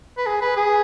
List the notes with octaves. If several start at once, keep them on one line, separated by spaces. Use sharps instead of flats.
B4
G#4
B4
G#4